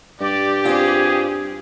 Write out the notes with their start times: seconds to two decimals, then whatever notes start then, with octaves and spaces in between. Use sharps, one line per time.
0.21 G2 G4 D5
0.65 C4 F4 G#4